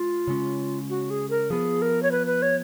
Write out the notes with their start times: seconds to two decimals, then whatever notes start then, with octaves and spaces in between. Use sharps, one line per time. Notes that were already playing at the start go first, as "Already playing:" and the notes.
Already playing: G#3 F4
0.27 C#3 G#3 C#4
0.90 F#4
1.10 G#4
1.30 A#4
1.50 F3 B3 G#4
1.82 A#4
2.03 C#5
2.11 B4
2.27 B4
2.42 C#5